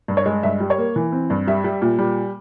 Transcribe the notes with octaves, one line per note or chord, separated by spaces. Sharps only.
G2
C#5
G#3
G2 E5
G3
C#5
A#3
E3
C4
G2
G3 E5
G3
A#2
G3